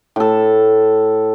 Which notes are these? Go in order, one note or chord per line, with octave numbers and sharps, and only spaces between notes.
A2 A4